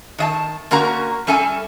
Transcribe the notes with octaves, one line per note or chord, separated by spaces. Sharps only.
D#3 D#5 A5
D3 A#3 C#4 F#4 A#4 A#5
G3 C#4 A4 E5 G#5